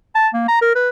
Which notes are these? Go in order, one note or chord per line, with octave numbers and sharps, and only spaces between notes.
A5
A#3
A#5
A#4
B4